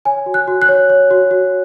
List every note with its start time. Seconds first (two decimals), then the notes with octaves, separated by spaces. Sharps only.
0.05 C#5 G#5
0.26 F#4
0.34 F#6
0.48 F#4
0.62 F#6
0.69 C#5
0.90 C#5
1.11 F#4
1.31 F#4